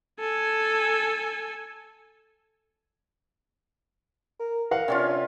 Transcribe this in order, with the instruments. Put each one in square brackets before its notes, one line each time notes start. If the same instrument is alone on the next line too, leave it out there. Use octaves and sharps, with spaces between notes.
[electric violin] A4 G#5
[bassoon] A#4
[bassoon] E3 [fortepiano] A#4 F5 F#5
[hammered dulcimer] C3 C#4 F4 [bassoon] D4
[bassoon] D4